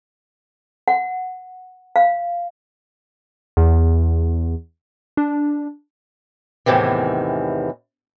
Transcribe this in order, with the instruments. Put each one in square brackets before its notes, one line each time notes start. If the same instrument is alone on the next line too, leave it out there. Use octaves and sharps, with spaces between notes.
[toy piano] F#5
F5
[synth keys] E2
D4
[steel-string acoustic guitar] E2 A2 C3 D#3 E3